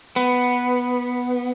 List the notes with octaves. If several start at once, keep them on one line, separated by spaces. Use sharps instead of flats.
B3